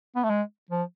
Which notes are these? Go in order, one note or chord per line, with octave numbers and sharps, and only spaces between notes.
B3
A3
G#3
F3